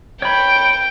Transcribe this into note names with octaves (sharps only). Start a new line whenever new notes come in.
C#5 G5 B5